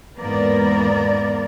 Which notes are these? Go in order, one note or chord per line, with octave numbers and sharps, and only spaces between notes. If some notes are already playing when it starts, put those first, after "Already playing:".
E2 G#2 A#3 B3 A#4 D5